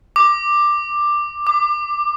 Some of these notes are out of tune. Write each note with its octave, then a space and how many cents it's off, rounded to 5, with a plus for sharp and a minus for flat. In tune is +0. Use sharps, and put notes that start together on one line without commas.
D6 +10
D6 +30